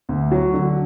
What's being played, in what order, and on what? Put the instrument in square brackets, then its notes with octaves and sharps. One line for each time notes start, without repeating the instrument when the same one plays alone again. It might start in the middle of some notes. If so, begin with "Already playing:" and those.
[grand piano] D2
F#3
D3